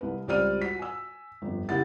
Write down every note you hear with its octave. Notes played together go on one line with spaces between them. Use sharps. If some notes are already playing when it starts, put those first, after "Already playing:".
C2 B4
C#2 G3 C4 D5 F6 D#7
F#4 B6
G#5 E6
G1 F2
C#3 A#3 E4 G4 F#5 A6